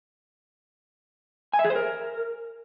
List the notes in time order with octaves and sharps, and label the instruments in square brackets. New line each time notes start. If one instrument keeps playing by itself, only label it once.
[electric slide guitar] G#5
E5
G#4
C5
A#4